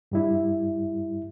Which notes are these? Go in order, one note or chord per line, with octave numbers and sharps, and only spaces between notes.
G2 G3 E4